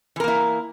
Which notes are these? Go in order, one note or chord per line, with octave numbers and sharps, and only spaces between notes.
E3 A#3 E4 A#4